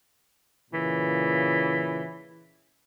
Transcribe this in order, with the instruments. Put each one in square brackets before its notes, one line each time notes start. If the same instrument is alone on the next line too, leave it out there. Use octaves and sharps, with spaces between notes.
[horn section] A#2 C#3 E3